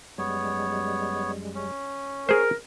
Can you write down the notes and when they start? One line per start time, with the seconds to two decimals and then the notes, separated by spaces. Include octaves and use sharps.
0.18 F#2 G3 G#3 B3 C#5
1.55 C#4
2.29 G#4 A#4 C5